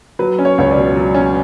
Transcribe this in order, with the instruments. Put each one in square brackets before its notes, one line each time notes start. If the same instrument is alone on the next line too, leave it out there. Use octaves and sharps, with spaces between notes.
[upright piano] F#3 B4
C#4
C#5
C#2 C#5
D5
B2
F#3
C#4